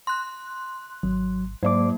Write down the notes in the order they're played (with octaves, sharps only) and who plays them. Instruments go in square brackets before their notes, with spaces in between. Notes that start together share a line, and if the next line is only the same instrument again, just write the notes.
[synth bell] C6 F#6
[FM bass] G#1 [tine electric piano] F#3
[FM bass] G#2 [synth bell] F#3 A#3 [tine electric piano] C5 D5 D6